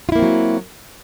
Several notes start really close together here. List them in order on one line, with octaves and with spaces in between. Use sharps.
F4 E4 A#3 C4 F#3